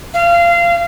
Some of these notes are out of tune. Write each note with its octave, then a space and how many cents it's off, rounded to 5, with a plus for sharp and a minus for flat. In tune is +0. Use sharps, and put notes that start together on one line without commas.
F5 -25